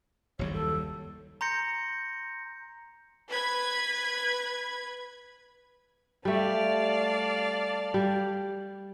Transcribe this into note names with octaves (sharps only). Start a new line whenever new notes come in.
F#1 D#2 G3 C#5
A4
A#5 C6 G6 A#6 C#7
B4 B5 G#6
G3 A3 D5 F5 A5
G3